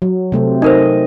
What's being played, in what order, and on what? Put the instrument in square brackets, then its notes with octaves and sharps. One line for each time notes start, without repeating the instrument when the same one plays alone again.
[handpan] F#3
C3 A3 C4
[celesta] D#4 A#4 C5 [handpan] D#5